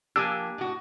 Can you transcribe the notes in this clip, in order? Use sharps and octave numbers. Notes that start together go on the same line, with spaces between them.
F3 A#3 D4 G4 G#5 E6
A2 F#4